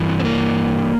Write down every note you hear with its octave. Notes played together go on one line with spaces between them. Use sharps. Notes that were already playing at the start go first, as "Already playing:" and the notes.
Already playing: G2 E3
C4
C4
A#3